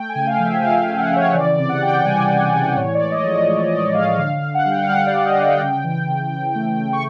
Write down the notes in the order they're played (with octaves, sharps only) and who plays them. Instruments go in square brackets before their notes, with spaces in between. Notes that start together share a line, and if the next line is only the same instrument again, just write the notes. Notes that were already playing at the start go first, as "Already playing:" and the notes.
Already playing: [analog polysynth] A3 G5
G#5
C#3
F5
F3
E5
C#3 F5
A3
F#5
C#3
C#5
E3 D5
C3 D5
F#5
C3 G5
G5
G3 G#5
D5
C3
D5
E3
D5
A2 C#5
D5
G#3
D#5
F3
D#5
G#3
D#5
A2 D5
G#3 F5
D3 F5
D3
F#5
G3
G5
F5
G3 F#5
D5
G3
D#5
D3
G5
C#3
E3
C#3
C#3
A3
C#3
C#6